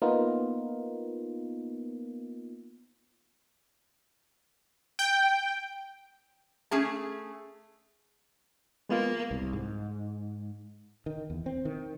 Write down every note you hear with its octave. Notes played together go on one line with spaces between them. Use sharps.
A#3 B3 D#4 F4 A#4
G5
A3 C#4 G#4 A5
G#3 A#3 B3 F4
C2
G#2
D#3
E2
C4
D#3